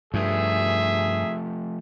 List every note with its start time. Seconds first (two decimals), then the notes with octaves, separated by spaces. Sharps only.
0.14 G2 F3 A3 G#4 E5